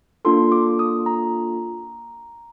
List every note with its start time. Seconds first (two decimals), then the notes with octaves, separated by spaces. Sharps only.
0.25 A#3 D4 F4 A4 C6
0.52 D6
0.79 D#6
1.06 A#5